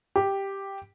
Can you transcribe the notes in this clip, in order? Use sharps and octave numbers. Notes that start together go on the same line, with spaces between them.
G4